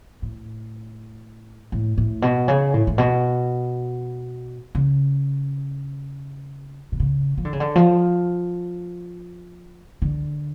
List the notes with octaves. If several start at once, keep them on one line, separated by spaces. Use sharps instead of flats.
A2
A2
A2
B2
C#3
A2
A2
B2
C#3
B2
C#3
F3
D3
C#3
D3
F3
D3